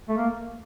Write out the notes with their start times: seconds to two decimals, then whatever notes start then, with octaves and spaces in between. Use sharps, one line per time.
0.09 A3
0.17 A#3